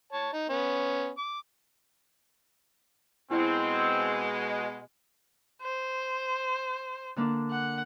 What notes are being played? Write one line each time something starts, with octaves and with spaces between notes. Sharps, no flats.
C#5 A5
D#4
B3 C#4
D6
B2 G#3 C4 E4
C5
D3 A#3 D4
F#5